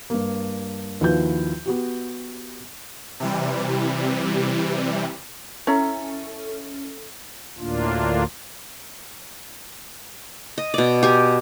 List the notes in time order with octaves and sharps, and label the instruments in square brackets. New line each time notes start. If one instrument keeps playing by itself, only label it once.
[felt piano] G2 A#3
D#2 F3 E4 F#4 B4 G6
B3 F#4 G4
[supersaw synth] C3 E3 G3
[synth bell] C#4 A4 [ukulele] E4 C#5 A#5
[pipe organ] D2 A2 A#3 D4 F4
[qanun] D#5
B2 D5
G4 G#5